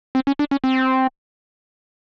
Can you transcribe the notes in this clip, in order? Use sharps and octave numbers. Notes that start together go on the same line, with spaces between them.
C4
C#4
D4
C#4
C4